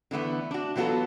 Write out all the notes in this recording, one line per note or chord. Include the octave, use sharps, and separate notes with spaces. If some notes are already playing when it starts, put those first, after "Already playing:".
D3 E3 A3 B3
D4 F#4
E3 F#3 B3 F4 F#4 A4